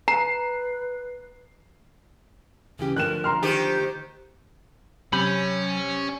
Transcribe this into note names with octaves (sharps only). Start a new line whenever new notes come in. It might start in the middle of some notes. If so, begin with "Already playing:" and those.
B4 A#5 C7
C#3 E3 C#4 G4
D3 F3 A3 A#4 F#6 E7
A#5 C6 F6
D#3 G4 C5
C3 F#3 C#4 B5 G6